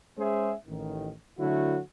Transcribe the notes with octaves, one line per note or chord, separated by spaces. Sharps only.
G#3 C#4 G#4 C5 E5
A1 D#3
D3 F#3 A3 E4 F#4